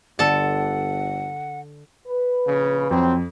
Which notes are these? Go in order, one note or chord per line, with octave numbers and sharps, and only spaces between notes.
G1 D3 A4 F#5 A5
B4
A#1 C#3
F2 F#3 C4